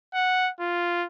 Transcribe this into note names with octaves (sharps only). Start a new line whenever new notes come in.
F#5
F4